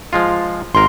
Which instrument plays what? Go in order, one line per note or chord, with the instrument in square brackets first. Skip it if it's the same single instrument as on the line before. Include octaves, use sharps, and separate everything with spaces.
[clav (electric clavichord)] F3 G#3 F4
[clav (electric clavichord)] G#1 A#4 [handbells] C6